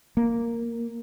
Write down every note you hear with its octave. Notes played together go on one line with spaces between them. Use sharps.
A#3